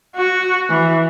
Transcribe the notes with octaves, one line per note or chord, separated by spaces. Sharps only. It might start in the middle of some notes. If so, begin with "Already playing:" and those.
F#4
E3